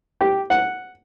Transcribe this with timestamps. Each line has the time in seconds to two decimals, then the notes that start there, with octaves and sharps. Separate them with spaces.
0.21 G4
0.50 F#5